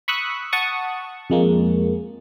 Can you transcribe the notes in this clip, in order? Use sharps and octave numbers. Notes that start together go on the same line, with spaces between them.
B5 C#6 D#6 E6 F#6
F#5 A5 C#6 D#6
F2 G#3 A#3